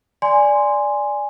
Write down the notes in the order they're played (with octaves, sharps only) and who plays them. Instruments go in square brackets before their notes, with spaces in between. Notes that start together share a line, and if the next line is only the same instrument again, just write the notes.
[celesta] D5 G#5 C6